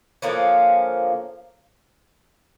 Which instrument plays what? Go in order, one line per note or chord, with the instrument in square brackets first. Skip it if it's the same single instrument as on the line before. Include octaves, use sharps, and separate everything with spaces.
[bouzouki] D3 F3 A#3 C#4